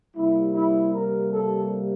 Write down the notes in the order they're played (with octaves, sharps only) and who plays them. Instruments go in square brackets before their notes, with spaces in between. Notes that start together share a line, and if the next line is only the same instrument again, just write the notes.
[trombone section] C3 G3 A#3 E4
E4
A#4
A4